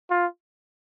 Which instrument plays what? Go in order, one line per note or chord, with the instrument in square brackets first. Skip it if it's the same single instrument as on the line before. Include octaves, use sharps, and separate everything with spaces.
[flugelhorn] F4